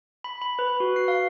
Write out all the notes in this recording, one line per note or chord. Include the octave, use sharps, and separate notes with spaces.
B5
B5
B4
F#4
C7
F5